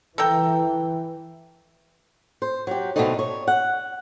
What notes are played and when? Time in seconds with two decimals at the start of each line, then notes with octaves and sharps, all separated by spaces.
0.18 E3 A4 A#4 G5
2.42 C5
2.67 F#3 G4
2.96 B2 D3 F#3 A3 C4 D#4
3.19 C#5
3.47 F#5